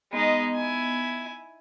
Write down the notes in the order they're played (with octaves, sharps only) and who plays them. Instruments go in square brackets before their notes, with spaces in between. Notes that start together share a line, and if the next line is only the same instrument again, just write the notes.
[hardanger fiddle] G#3 D#4 [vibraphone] B3
[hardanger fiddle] E4 G#5